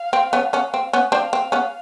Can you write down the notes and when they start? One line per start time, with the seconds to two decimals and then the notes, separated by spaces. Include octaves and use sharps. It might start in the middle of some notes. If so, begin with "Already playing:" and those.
Already playing: F5
0.13 C4
0.33 B3 C#4
0.53 B3 C#4
0.74 C4
0.93 B3 C#4
1.12 C4 D4 F5
1.33 C4
1.52 B3 C#4